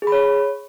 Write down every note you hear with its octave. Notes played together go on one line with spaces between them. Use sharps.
G#4
B5
C#5